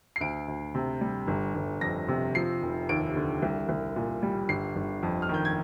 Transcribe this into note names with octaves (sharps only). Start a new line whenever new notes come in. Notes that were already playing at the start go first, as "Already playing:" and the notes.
C7
D2 D7
D2
C3
G3
G1
G1
F2 A#6
C3
F3 C7
F1
D#2 D7
D3
C2
C2
A#2
G3
G1 C7
G1
F2
F6
D#3
G6
G#6